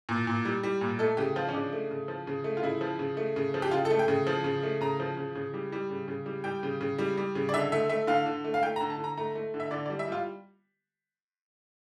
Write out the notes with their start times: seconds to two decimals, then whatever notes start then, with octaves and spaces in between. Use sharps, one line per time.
0.09 A#2
0.27 A#2
0.45 G3
0.63 G3
0.81 A#2
0.99 A3 A4
1.17 C#3 G4
1.36 F3 F4
1.48 C#4
1.54 C#3 D4
1.72 A3
1.91 C#3
2.08 F3
2.27 C#3
2.44 A3
2.57 F4
2.63 C#3 E4
2.81 F3
2.99 C#3
3.17 A3
3.36 C#3
3.54 F3
3.62 G4
3.71 C#3 F4
3.85 A4
3.90 A3
3.99 G5
4.08 C#3
4.27 F3
4.44 C#3
4.63 A3
4.81 C#3 A#5
5.00 F3
5.17 C#3
5.35 C#3
5.54 G3
5.72 G3
5.90 C#3
6.08 C#3
6.26 G3
6.44 G3 G5
6.63 C#3
6.81 C#3
6.98 G3
7.17 G3
7.35 C#3
7.49 D5
7.53 D3 E5
7.72 A3 E5
7.89 A3 E5
8.07 D3 F5
8.26 D3
8.44 A3
8.54 F5
8.63 A3 G5
8.76 A#5
8.80 D3
8.90 A5
8.98 D3
9.04 A#5
9.17 A3 A#5
9.35 A3
9.54 D3
9.60 E5
9.71 D3 D5
9.86 D5
9.90 G3
9.99 E5
10.08 G3 F4